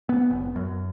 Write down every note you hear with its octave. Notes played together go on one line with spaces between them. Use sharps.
B3
F#1
F#2